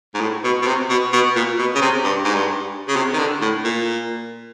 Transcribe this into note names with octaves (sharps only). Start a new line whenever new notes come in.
G#2
A2
B2
B2
C3
B2
B2
A#2
B2
C#3
C3
G2
G#2
G2
C#3
C3
D#3
D3
A2
A#2